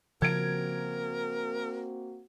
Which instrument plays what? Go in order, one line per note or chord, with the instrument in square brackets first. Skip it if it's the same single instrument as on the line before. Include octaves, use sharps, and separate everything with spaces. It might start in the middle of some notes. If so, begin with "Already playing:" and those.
[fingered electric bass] C#3 F3 [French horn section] A#3 C4 F#4 [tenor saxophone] A#4 [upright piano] G#6 D7